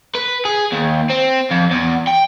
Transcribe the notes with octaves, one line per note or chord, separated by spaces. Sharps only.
B4
G#4
D#2
C4
F2
E2
G5